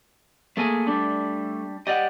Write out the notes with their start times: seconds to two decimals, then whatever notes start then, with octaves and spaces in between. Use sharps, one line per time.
0.57 A3 A#3 G#4 A4 G#5
0.87 G3 D4
1.87 G4 D5 D#5 F#5